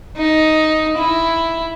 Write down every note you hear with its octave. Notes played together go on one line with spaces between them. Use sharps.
D#4
E4